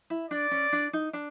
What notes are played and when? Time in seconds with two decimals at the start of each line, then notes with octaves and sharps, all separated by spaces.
0.10 E4
0.31 D4 D5
0.51 C#4
0.73 D4
0.93 D#4
1.13 D4